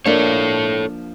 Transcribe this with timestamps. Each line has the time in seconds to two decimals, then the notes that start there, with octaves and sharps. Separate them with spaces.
0.06 F3 A#3 D4 A4 C#5